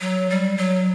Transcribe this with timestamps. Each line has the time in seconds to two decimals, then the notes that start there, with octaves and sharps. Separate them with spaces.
0.01 F#3
0.30 G3
0.57 F#3